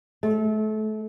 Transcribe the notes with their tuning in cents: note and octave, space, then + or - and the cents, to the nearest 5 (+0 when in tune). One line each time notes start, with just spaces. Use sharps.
A3 -30